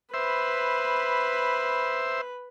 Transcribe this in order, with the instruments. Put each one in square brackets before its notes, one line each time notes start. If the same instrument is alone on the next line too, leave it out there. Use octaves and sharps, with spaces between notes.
[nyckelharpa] B4 B5 [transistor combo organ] C5 E5